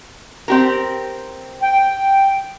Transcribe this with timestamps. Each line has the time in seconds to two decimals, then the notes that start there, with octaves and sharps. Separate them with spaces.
0.48 C4 G4 A#4
1.62 G5